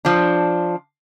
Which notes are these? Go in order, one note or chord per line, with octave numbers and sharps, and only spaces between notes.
F3 D4